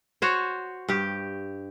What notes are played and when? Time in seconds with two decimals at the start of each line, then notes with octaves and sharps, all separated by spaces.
0.22 F#4 C5 C#5
0.88 G2 G4